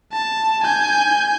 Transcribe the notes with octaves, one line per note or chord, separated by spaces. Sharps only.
A5
G#5 G6